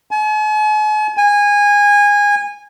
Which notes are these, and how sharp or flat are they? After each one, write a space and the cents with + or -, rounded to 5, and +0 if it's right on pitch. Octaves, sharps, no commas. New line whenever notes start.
G#5 +45
G#5 -20